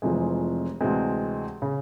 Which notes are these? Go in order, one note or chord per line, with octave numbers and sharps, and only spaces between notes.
F1 F2 C3 E3 G#3
D2 C3 E3 G#3 C4
C#3